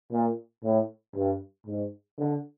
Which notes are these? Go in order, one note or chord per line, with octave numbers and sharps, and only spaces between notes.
A#2
A2
G2
G#2
D3